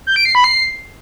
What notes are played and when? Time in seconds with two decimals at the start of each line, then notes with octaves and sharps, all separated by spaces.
0.07 G6
0.16 D7
0.25 C7
0.35 B5
0.44 C7